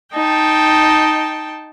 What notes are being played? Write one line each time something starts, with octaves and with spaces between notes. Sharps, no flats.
D#4 G5 A5